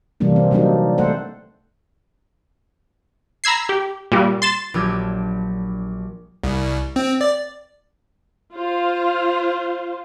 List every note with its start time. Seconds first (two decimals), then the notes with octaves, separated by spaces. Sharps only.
0.20 C3 E3 G3 A#3 D4
0.36 C4
0.51 F#3 G3 A#3 C4 D4 D#4
0.98 A3 A4 C5 F#5
3.44 A#5 B5 E6 G#6 C7
3.69 G4
4.12 A#2 G3
4.42 C6 A6 E7
4.74 A#1 F#3 D4 G4 E6 G#6
6.44 C2
6.96 C4
7.21 D5
8.53 F4 C5